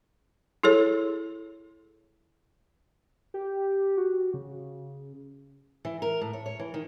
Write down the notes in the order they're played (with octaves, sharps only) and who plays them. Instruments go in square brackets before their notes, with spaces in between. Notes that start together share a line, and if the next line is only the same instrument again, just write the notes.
[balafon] E4 G#4 A4 C#5
[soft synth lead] G4
F#4
C#3
[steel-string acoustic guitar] E3
A#4
A2
C#5
C#5
E3
D#3